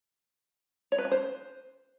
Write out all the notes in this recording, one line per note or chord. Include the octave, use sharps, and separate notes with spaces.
C#5
B4
G#5
C5